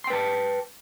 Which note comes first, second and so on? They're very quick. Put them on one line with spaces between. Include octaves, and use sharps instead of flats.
C6 G5 B4 A5